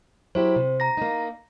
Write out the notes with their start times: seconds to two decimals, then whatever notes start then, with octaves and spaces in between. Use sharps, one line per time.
0.35 F#3 E4 G4 C5
0.56 C3
0.80 A#5 A#6
0.97 A#3 D#4